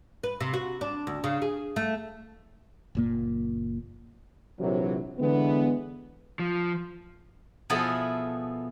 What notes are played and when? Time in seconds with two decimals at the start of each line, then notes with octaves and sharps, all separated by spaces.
0.24 B4
0.40 C3
0.54 F#4
0.81 D4
1.07 D2
1.24 C#3
1.42 G#4
1.76 A3
2.95 F#1 A#2 A#3
4.59 A#1 C3 E3 F#3
5.19 D3 E3 G#3 B3
6.39 F3
7.70 B2 F3 B3 E4 G#4 A4